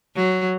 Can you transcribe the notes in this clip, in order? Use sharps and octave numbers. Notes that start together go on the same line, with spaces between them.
F#3